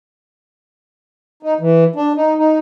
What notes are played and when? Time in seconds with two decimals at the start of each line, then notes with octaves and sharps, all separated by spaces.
1.43 D#4
1.60 E3
1.96 D4
2.15 D#4
2.38 D#4